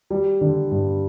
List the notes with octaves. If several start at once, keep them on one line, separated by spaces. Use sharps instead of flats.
G3
D3
G2